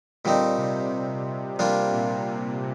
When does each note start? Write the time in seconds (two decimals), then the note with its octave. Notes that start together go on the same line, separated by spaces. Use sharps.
0.25 A#2 D3 G3 C4 D#4
0.58 C3
1.59 C3 G3 A#3 D4 F4
1.92 A#2
2.26 C3